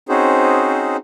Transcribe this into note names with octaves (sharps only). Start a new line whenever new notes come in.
C4 C#4 D#4 F#4 G#4 C5